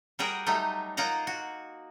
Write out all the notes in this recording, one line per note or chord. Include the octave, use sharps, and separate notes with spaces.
G3 F#4 G#4 A#4 G5
F#3 G3 A3 D#4
A#3 D#4 F4 F#5 A#5
F#4